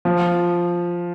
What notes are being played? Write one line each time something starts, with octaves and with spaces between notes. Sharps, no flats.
F3